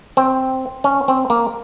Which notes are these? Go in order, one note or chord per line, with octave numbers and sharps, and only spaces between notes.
C4
C#4
C4
A#3